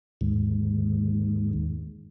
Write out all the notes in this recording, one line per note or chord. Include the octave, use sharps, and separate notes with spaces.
D#2 G#2